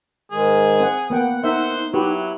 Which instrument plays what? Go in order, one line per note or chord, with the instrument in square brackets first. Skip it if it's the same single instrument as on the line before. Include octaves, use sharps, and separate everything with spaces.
[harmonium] G#2 D#3 G#3 [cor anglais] G#4
[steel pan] C4 F#5
[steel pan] A#3 B3 G5 [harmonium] F#5
[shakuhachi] D#4 [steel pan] A#4 E5 [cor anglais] C5
[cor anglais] F#3 [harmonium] E4 [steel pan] F#4 G4 B4